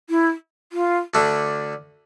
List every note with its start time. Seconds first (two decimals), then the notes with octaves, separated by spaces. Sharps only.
0.10 E4
0.72 F4
1.14 D2 D3 A3 D4